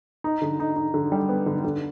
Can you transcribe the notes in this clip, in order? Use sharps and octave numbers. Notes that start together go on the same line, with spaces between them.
D#4
D3
D#4
D#4
D3
G3
B3
D3
D3